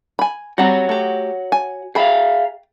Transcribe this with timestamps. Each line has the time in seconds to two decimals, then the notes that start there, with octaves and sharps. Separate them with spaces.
0.19 G#5 B5
0.58 G3 C4 F#4 C#5 F#5
0.89 A3 G4
1.52 G#5
1.95 G#4 E5 F5 G5 B5